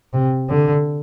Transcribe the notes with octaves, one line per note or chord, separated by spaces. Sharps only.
C3
D3